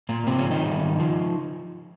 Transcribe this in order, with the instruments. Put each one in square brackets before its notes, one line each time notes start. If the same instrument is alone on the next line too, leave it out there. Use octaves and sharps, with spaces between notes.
[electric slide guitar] A#2 A#3
G#2 C3 F3 C4
C#3 C#4
D#3 D#4
G#2 G3
C#3 F3